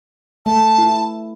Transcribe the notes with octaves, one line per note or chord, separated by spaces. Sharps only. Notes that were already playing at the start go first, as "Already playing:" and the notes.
A3 A5
E4